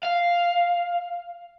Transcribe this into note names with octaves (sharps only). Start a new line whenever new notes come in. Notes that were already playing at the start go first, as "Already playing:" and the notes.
F5